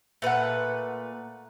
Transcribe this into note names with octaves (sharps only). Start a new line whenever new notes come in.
A#2 A3 B4 F#5